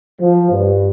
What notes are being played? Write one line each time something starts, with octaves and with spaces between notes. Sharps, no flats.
F3
G2